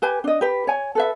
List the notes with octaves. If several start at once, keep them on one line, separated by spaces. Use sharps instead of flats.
G4 B4 G#5
D4 D#5
G4 B4
C#5 G#5
A4 B4 E5